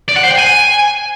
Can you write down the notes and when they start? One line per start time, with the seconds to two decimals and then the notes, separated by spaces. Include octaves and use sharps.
0.08 D5
0.16 F#5
0.23 C5
0.31 G5
0.38 G#5